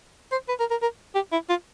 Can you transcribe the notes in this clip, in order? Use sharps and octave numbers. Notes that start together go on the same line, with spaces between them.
C5
B4
A#4
A#4
A#4
G4
E4
F4